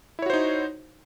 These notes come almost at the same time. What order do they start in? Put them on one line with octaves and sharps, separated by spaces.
E4 C#5 F#4 C5 D#4